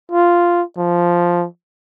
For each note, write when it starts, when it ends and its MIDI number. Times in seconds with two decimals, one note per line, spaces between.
0.12 0.62 65
0.77 1.46 53